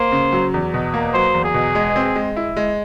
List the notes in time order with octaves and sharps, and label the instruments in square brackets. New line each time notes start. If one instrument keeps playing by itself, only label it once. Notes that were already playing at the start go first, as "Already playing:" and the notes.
Already playing: [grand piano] A#3 [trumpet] C5
[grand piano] C#3
F#3
E2
B2
A#3
[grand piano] F#3 [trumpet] C5
[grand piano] E2
[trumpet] G#4
[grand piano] B2
G#3
C4
G#3
E4
G#3